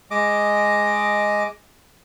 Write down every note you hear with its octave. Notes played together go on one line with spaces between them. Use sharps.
G#3 D#5 D6